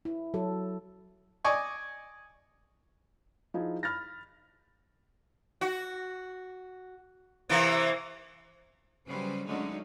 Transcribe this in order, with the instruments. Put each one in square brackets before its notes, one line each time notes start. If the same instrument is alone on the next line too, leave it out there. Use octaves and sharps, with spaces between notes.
[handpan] E4
F#3 A4
[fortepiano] D5 D#5 G#5 C#6
[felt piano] F3 D#4 E4 G#4
B5 F6 A6 A#6
[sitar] F#4
C3 E3 A#3
[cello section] C#3 F#3 G3 C#4 B4 C5
D3 F#3 G#3 A3 C#4 D#4